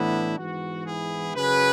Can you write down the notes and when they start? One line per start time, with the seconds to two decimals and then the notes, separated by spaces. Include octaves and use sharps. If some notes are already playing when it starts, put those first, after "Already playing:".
Already playing: A2 E3 B3 D4 E4
0.37 G#2 E3 B3 F#4
0.86 E4 G#4
1.36 F#2 C#3 F#3 G#4 B4